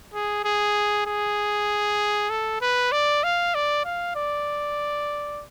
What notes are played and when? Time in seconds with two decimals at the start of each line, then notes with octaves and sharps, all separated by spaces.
0.14 G#4
0.45 G#4
1.07 G#4
2.30 A4
2.61 B4
2.92 D5
3.23 F5
3.55 D5
3.85 F5
4.16 D5